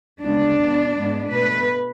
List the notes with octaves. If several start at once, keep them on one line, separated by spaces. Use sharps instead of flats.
D2 C#3 G#3 B3 D4
B2 G#3 B3
G#2 G#3 B3
B2 A3 B4